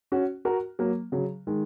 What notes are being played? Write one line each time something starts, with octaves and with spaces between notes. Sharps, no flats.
C#4 F#4
F#4 A#4
F#3 A#3
C#3 F#3
D#3 G#3